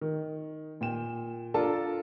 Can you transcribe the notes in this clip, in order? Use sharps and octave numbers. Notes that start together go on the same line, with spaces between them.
D#3
A#2 G5 E7
D4 F4 A4 A#4 A5